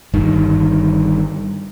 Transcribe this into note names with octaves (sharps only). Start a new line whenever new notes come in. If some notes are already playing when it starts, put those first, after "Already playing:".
G1 G2 D#3